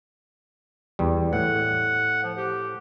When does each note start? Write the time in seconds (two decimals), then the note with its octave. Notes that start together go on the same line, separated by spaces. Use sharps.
0.99 E2 G3
1.33 A2 F#5
2.23 F3
2.37 G4